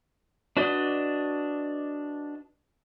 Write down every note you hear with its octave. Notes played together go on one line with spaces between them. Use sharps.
D4 F#4 B4 D5 D#5